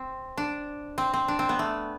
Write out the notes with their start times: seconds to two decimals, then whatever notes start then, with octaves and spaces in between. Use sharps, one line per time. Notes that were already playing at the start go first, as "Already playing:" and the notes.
Already playing: C4
0.37 D4
0.98 C4
1.14 C4
1.28 D4
1.39 C4
1.49 B3
1.59 A3